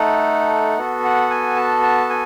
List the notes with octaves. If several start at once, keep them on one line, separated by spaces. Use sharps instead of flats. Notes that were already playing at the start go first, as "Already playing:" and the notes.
Already playing: A3 D#4 A4 F#5
B3 F#4 A4
F#5
G#5
A5
A5
G#5